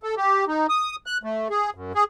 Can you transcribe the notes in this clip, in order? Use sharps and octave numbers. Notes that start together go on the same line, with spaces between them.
A4
G4
D#4
D#6
F#6
A3
G#4
F#2
G#4